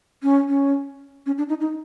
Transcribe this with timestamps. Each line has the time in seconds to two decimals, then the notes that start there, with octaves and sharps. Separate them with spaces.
0.23 C#4
0.48 C#4
1.26 C#4
1.38 D4
1.49 D#4
1.61 D#4